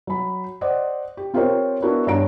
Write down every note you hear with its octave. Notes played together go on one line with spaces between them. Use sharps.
F#3 B5
C5 D5 D#5 F#5
G4
C4 F4 G4 A#4 C5 C#5
B3 D4 E4 F#4 A#4
G2 D4 C#5 A#5 D7